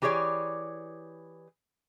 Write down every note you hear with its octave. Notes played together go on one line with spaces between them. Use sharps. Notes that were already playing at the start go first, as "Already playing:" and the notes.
E3 G4 G#4 C#5 D5